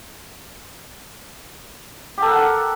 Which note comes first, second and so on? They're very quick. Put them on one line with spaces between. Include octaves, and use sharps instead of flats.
G4 A4 A#4 F#5